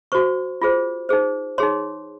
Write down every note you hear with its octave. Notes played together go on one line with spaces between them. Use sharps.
F#4 C5 C#6
F4 G#4 C5
D#4 G#4 C5
D#4 G#4 C#5 C6